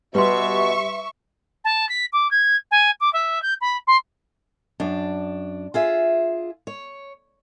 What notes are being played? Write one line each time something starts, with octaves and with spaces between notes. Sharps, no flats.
B2 G3 B4 E5 C6 C#6
A5
B6
D6
G#6
G#5
D6
E5
G6
B5
C6
F#2 D4
F4 G#4 E5
C#5